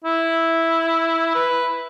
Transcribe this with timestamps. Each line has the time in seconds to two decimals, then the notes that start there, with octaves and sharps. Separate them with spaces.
0.05 E4
1.35 B4